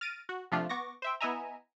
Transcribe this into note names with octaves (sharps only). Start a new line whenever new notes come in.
F6 A6 A#6 D7 D#7
F#4
C3 F3 A3 D4 F4
B3 C#6 D6 A#6
C5 E5 G5
B3 E4 D#5 E5 G#5 A#5